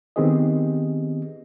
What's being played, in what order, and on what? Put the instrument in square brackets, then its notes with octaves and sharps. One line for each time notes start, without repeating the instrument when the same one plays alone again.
[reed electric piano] D#3 B3 C4 G4 G#4 D#5